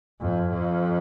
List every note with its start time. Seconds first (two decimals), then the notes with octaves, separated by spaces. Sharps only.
0.21 F2
0.50 F2